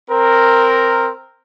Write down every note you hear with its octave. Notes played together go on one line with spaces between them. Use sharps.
C4 A#4